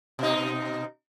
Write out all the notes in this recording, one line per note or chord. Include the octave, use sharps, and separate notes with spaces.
B2 D#4